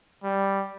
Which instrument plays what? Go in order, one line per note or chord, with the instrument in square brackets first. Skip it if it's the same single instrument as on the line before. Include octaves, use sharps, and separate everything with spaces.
[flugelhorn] G3